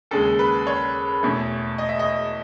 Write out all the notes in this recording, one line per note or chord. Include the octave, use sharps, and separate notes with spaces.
D#2 C#3 G#3 A4
B4
C#5
E2 B2 A3
D#5
E5
D#5